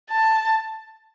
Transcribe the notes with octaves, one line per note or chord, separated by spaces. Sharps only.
A5